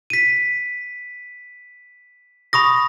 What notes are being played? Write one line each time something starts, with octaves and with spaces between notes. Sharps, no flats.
B6 D#7
B5 C#6 D#6 A#6